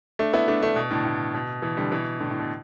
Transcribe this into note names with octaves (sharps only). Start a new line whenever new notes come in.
A3 D4
B3 E4
A3 D4
A3 D4
B2
A2 D3
A2
B2
B2 E3
D3 G3
B2 E3
A2 D3
A2
B2